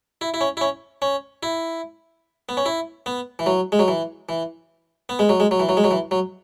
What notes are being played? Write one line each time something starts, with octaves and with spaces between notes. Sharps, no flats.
E4
E4
C#4
E4
C#4
C#4
E4
B3
C#4
E4
B3
E3
F#3
G#3
F#3
E3
E3
B3
G#3
F#3
G#3
F#3
E3
F#3
G#3
F#3
E3
F#3